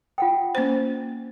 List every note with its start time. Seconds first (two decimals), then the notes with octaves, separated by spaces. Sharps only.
0.18 F4 F#5 G5
0.55 A#3 C#4 C5